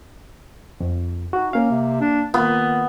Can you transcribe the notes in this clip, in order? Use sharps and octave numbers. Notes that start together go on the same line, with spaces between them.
F2
D#4 F#4
A#3 C#4 F5
C3
D4
D#3 A#3 B3 F4